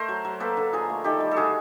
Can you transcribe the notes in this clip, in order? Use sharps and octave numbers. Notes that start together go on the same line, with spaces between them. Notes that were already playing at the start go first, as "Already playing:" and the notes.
Already playing: A3 A#4 C5
F#3
F#3
A#3 A4 B4
D3
F3 G#4 A#4
A3
D#3 G4 A4
G3
A4
D3 F#4 G#4